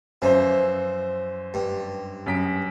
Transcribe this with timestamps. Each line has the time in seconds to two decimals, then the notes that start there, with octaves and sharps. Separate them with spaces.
0.22 F#2 E3 F3 C5
1.54 G2
2.26 F#2 B6 D7